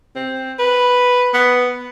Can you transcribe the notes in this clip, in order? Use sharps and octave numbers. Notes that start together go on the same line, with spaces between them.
C4
B4
B3